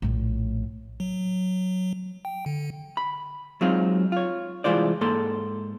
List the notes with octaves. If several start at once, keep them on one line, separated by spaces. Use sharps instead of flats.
A#1 A2
F#3
G5
D3
B5
F#3 G#3 C4 D#4 F4
F4 C#5
C2 E3 G#3 F4 C5 D5
G#2 A#3 A4 C6